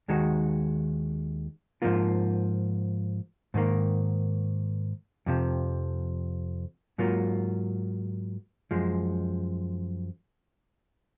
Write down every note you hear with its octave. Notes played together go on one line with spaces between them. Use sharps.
D#2 D#3 G#3 D#4 F#4
G#2 F3 A#3 F4
G#2 D#3 A#3
F2 C3 F3
G#2 F#3 A#3 F4
F#2 F3 G#3